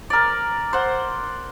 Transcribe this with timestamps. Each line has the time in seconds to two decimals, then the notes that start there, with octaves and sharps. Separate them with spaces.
0.10 A#4 D5
0.73 C5 F#5